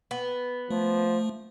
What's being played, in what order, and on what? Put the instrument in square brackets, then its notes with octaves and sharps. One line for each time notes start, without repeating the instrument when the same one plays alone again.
[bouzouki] B3
[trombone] F3 [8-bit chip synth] A3